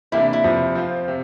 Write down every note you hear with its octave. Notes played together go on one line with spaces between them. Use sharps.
C3 E3 A#3 D4 E4
E4
F2 C3 F3
F3 C4 F4 C5
C3